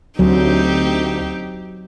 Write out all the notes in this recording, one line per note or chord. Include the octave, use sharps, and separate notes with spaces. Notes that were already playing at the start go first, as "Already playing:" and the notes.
D2 F#3 C4 D#4 G4